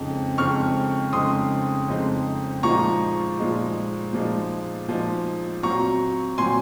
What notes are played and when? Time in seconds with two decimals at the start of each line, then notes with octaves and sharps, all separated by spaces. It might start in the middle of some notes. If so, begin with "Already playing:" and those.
Already playing: F2 C#3 G#3 C4 D#4
0.38 F2 C#3 G#3 C4 D#4 C#6 F6
1.12 F2 C#3 G#3 C4 D#4 C6 D#6
1.88 F2 C#3 G#3 C4 D#4
2.63 A#2 F3 G#3 D#4 A#5 C#6
3.38 A#2 F3 G#3 D#4
4.13 A#2 F3 G#3 D#4
4.88 A#2 F3 G#3 D#4
5.63 A#2 F#3 C4 A#5 C#6
6.38 A#2 F#3 C4 G#5 C6